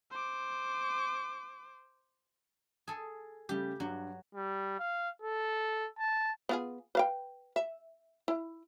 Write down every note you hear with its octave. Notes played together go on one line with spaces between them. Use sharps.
C5 D6
G#4 A4
C#3 G3 A3 G4
G2 F#3
G3
F5
A4
A5
B3 F4 G#4
B4 F5 G5
E5
E4